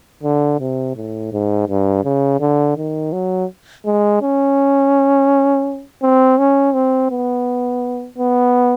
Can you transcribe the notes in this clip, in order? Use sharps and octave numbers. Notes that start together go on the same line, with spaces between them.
D3
C3
A2
G#2
G2
C#3
D3
D#3
F#3
G#3
C#4
C4
C#4
C4
B3
B3